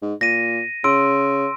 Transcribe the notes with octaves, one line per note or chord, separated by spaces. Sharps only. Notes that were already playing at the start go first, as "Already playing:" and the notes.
G#2
A#2 A#6 D#7
C#3 C6 E6 D7